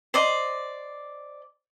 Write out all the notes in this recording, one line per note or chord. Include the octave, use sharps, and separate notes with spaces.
C5 D5 D#5